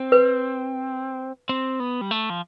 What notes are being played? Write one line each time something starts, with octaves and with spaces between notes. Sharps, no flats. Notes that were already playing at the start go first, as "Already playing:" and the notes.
Already playing: C4
B4
C4
B3
G3
A3
F3